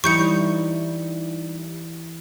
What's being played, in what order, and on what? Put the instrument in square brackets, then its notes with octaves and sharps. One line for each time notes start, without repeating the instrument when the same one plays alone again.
[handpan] E3 E4 [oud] G3 D#4 [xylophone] C#6 G6 C#7